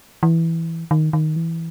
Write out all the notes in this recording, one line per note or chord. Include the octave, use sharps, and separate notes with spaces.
E3
D#3
D#3
E3